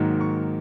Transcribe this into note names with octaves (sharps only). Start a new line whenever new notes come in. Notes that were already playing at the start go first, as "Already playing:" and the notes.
Already playing: G#2 D#3 F#3 A#3
C#6